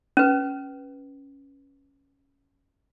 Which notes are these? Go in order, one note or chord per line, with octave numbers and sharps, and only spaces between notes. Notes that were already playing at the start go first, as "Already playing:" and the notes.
C#4 B4